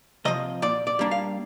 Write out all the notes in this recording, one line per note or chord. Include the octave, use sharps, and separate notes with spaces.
C3 F3 D#5
A#2 D5
D5
G3 A#3 D4
F5